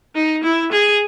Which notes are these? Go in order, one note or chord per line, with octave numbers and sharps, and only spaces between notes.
D#4
E4
G#4